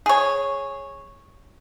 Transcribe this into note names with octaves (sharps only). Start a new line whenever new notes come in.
G#4 C#5